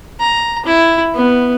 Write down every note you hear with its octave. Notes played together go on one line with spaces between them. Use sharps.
A#5
E4
B3